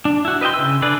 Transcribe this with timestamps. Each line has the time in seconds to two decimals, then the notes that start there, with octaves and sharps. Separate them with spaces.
0.05 D4
0.25 E4 F#4
0.41 B4 D#5 E5 G5 C6
0.54 C#3 E6
0.82 D3 D4 G#4 B4 D5